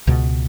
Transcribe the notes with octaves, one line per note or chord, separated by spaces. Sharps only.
C#2 B2